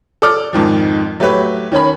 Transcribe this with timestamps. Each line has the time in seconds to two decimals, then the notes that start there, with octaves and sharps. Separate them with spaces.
0.22 A4 D5 D6 F6
0.53 F2 G#2 D#3 F3
1.20 F#3 A3 G4 B4 C#5
1.72 D#3 C#4 C#5 B5